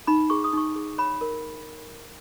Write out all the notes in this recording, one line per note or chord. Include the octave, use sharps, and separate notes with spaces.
D#4 B5
G#4 C#6
D#6
D#4 C#6
G#4
C#5 B5
A#4